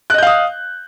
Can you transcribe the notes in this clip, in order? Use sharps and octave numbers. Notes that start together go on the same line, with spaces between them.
D#5 F5 D#6 F#6 G6